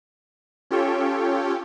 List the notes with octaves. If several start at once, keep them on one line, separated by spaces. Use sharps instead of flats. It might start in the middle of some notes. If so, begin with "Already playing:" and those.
C#4 F4 G4 A4 C#5 G5